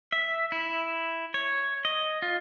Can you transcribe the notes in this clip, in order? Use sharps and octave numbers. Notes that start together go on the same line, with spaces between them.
E5
E4
C#5
D#5
F4